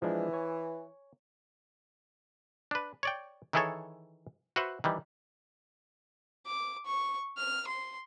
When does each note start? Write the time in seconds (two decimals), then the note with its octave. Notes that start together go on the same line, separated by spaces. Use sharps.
0.02 E3 F3 G#3 D4
0.33 C#5 G#5
2.71 D4 B4
3.03 C#5 D5 G5
3.53 D#3 E3 E4 G#4 A4 C#5
4.56 F#4 B4 C5 E5 F#5
4.84 D#3 E3 G3
6.46 D6
6.85 C#6
7.37 F6
7.67 C6